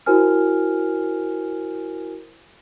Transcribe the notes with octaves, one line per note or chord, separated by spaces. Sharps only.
E4 F#4 A#4 C5 G#5 F6